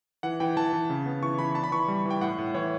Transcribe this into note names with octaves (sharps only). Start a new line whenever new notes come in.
E3 F#5
E3 G5
E3 A5
E3
C#3
B3
E3 C#6
E3 B5
D4 A5
B5
E3 C#6
B5
G3
E3
G5
A2 F#5
A2
E3 C#5